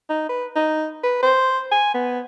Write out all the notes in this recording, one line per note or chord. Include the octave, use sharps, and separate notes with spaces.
D#4
B4
D#4
B4
C5
G#5
B3